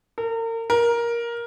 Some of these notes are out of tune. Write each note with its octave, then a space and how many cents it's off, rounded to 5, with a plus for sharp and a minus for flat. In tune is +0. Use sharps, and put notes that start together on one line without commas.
A#4 -40
A#4 +10